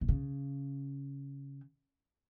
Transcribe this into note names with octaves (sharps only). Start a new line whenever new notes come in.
B2
C#3